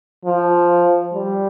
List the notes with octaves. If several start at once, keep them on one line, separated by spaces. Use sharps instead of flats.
F3
G3